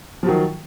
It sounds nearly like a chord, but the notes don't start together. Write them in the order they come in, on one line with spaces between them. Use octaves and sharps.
F3 F#3 D#3